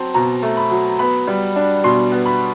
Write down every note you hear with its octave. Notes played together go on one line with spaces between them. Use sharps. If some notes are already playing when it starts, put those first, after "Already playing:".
Already playing: F#3 C4 A5
B2 A#5
A3
B5
F#3
B3 B5
G3
D4
B2 C6
B3
B5